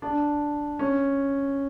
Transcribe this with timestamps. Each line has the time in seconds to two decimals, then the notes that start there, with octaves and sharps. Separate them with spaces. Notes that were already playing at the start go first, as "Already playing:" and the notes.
0.02 D4
0.79 C#4